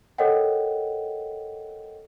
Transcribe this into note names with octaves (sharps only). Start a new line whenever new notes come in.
A4 A#4 C#5 D#5 F#5 G5